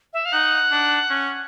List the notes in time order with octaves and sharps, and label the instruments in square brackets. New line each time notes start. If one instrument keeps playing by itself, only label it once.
[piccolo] E5
F5
[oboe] D#4 [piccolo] F#5
[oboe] D4
C#4